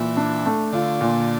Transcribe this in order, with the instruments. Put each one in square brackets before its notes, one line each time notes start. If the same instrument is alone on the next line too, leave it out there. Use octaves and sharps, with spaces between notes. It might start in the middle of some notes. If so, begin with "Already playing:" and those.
Already playing: [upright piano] A#2 [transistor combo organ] E3
[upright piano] D4
A3
[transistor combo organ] D3 [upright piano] F4
[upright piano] A#2